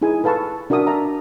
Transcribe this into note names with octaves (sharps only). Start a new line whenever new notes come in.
D#4 E4 G#4 G#5
A4 B4 F5 A5 B5 C#6
D4 F#4 A#4 E5 D#6
A#4 E5 A5 A#5